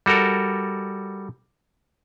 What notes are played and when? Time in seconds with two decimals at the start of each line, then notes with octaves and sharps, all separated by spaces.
0.06 G3 F#4 A4 A#4